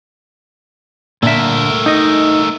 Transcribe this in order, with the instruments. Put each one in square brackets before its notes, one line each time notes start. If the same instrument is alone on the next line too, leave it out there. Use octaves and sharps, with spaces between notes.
[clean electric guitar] A#2 D3 E5 [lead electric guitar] A3 A#4
[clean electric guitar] D#4 D#5